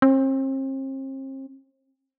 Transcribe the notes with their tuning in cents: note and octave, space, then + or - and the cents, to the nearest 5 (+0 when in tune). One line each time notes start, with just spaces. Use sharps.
C4 +40